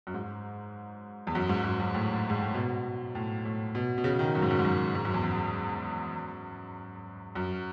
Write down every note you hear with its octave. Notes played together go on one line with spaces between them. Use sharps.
F#2
G#2
E2
F#2
G#2
F#2
F#2
A2
G#2
A2
B2
A2
A2
B2
B2
C#3
D#3
F#2
G#2
F#2
G#2
F#2
G#2
F#2
E2
F#2
F#2